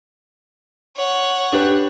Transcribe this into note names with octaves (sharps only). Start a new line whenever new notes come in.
C#5 F#5
D4 G4 B4